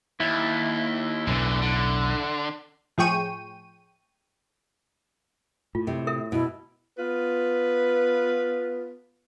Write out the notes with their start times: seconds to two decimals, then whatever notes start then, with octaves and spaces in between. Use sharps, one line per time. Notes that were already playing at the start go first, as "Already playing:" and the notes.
0.20 D#2 E4
1.27 B1 E2 A2 D3 E3
1.62 D3
2.98 A2 F3 G#4 G5 C#6 D#7
5.75 A2 F4
5.87 C3
6.07 A4 A#4 E5
6.32 B2 E4
6.99 B3 F4 B4